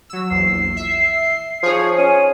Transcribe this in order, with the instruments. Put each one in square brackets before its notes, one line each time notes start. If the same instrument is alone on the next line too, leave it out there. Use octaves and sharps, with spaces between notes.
[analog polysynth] F#3 E6
[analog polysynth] A#1 E2 [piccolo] C7
[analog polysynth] E5
[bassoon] F3 [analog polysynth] D#4 G#4 C#5
[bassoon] C#4 [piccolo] D#7